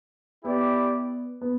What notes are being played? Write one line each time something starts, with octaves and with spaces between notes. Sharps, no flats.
B3 E4 G4 D5
B3